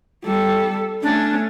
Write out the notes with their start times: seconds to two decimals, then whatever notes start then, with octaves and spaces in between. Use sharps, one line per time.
0.24 G3 A4
1.02 A3 C#4 D4